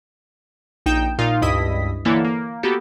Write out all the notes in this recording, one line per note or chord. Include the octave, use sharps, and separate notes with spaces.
A#1 D#4 G5 G6 E7
A#2 D#4 F4 F5
C#2 G2 E4 D#5 D#6 B6
D3 E3 A#3 E4 A4 C#5
A#3
A#3 B3 F#4 G4 A4